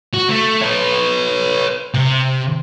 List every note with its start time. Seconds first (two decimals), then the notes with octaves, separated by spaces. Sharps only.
0.14 F#4
0.29 A3
0.61 B4 C#5
1.94 C3